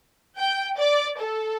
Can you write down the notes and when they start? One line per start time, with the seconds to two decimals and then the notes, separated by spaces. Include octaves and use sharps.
0.38 G5
0.79 D5
1.19 A4